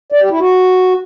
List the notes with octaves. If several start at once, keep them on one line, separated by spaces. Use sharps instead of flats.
D5
G4
E4
F#4